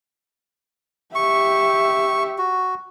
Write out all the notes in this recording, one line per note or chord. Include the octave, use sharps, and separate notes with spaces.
G4 E5 C#6
F#4